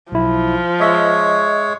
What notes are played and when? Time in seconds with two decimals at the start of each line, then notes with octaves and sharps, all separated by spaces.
0.12 B1 F3 E4
0.80 G#3 C#5 D#5 E5